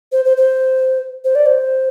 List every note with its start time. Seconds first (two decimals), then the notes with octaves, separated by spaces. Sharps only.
0.12 C5
0.25 C5
0.37 C5
1.25 C5
1.35 D5
1.46 C5